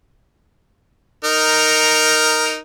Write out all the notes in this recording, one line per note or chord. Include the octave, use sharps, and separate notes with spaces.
D#4 A#4